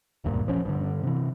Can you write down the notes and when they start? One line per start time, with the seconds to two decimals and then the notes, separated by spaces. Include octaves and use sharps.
0.24 E1 D2 G2 A#2
0.45 F1 A#1 F3 C#4
0.65 G2 D3
1.03 C3 E3